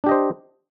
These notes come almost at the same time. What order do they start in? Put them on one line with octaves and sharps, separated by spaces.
D4 G4 D#5 C5